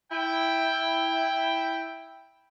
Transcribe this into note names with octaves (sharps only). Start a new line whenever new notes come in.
E4 G5